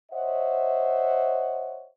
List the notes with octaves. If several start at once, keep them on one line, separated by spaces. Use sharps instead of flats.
C5 C#5 D#5 E5 F#5